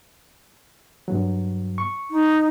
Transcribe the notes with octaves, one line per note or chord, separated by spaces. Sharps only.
G2 F#3
C#6
D#4